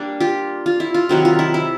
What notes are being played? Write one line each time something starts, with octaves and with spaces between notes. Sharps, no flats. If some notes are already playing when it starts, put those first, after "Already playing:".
Already playing: G3 A#3 D4
F4 G4
F4
E4
F4
C3 D#3 F#3 E4 F#4
F4
E4
E4